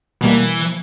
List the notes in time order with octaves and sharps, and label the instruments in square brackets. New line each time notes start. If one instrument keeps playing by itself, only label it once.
[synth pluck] B2 G3 A#3 [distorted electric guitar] E3